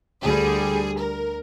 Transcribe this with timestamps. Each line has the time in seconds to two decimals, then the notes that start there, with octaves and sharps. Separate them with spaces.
0.23 D2 D3 G3 G#4
0.99 A#4